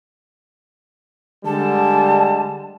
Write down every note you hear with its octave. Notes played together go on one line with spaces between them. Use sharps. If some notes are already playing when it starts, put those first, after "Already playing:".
D3 G3 G#3 A5